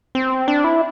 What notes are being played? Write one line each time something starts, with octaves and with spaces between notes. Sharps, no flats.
C4
D4
E4